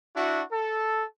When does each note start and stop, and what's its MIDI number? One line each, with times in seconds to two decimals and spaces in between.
0.16 0.43 62
0.16 0.43 64
0.16 0.43 66
0.52 1.04 69